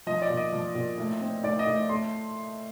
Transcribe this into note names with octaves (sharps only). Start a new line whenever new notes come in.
F3 D#5
D5
A#2
D#5
F3
A#2
A2
C4
A2 D5
D#5
A2
A3 C6